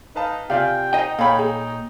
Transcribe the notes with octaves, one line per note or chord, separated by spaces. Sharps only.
D#4 B4 F5 A5
C3 F4 D5 F5 G5 G#5
D#4 C5 D#5 G5
A#2 A4 C#5 F5 G5 B5
G#4